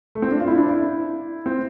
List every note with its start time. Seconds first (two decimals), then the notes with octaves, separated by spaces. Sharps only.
0.15 A3
0.22 C4
0.32 D4
0.40 F4
0.47 E4
0.58 D4
0.69 E4
1.46 C4